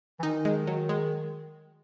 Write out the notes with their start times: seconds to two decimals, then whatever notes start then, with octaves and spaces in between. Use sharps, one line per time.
0.19 E3
0.23 D#3 D#4
0.45 G#3
0.67 F#3
0.89 G#3